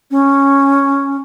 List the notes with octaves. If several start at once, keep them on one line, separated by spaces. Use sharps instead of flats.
C#4